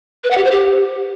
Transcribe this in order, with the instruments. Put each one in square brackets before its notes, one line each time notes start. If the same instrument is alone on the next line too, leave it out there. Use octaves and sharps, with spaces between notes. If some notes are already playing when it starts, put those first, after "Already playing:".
[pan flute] B4
F#5
G4
C5
G4